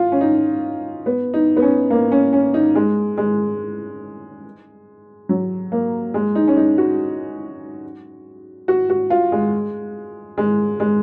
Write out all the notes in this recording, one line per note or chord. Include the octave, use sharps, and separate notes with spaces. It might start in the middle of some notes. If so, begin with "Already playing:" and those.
Already playing: F4
C#4
D#4
B3
D#4
B3
C#4
A#3
C#4
C#4
D#4
G#3
G#3
F#3
A#3
G#3
D#4
C#4
D#4
F#4
F#4
F#4
F4
G#3
G#3
G#3